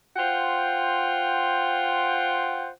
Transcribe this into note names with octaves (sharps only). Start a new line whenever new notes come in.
F4 C5 F#5 G5